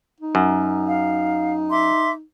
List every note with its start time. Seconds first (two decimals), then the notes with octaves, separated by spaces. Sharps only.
0.20 D#4
0.35 F#2
0.87 F5
1.70 E5 C6 D6